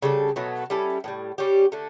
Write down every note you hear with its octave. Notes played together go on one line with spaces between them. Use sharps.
C#3 G3 D4 A4
B2 F#3 A3
G3 C#4 E4 A4
A2 E3 G3
G3 C#4 G4
D3 A3